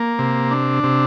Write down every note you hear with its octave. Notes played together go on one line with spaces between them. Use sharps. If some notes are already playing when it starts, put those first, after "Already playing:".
Already playing: A#3
C3
D4
C3